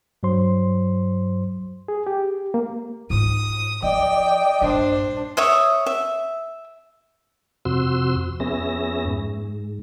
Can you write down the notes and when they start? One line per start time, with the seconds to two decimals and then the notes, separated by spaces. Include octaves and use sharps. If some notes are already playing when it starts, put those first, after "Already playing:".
0.23 G2 F#3 C5 C6
1.88 G#4
2.07 G4
2.54 A#3
3.10 G#2 F4 D#6
3.82 F3 F4 D5 D#5 G5
4.62 A#1 G2 D4 C5
5.37 C#5 E5 D#6
5.87 E5
7.65 F2 C3 F#4 C6 E6
8.40 F2 B3 C#4 G#4 E5 A#6
9.07 G#2